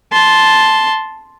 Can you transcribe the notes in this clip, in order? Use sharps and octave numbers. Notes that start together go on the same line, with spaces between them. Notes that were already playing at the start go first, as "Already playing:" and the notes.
A5 C6